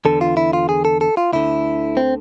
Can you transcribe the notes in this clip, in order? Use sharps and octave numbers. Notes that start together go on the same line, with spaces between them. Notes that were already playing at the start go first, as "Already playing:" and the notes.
E2 D3 A4
F4
E4
F4
G#4
A4
A4
F4
D2 D3 E4
C4